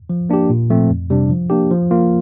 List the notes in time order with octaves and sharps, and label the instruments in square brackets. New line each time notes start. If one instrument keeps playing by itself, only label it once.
[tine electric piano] F3
A#3 D4 G4
A#2
F3 A3 C4
F2
C3 G3 D4
F3
A#3 D4 G4
F3
A#3 F4